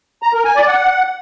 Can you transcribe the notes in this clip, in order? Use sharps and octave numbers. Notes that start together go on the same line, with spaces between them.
A#5
A#4
G#5
D5
F#5